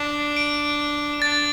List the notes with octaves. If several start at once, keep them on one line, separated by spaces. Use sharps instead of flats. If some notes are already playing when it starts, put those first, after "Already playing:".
Already playing: D4
D7
D4 A6